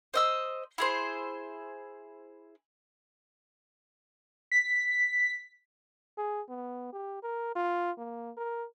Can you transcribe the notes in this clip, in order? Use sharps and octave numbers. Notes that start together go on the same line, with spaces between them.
C5 D#5 E6
E4 G#4 C5
B6
G#4
B3
G4
A#4
F4
A#3
A#4